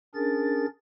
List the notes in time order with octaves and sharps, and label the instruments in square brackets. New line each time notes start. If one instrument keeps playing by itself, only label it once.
[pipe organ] C#4 D4 G#4 A#4 A6